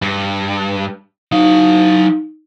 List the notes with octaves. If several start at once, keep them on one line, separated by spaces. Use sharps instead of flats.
G2
F#3 D#4 F5